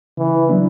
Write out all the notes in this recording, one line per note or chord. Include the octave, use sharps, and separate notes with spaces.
C#3 E3
F#3 B3 D4